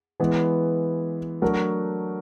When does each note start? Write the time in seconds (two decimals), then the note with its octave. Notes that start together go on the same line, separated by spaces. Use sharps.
0.20 E3 G#3 B3
1.42 F#3 A3 D4 F#4 A#4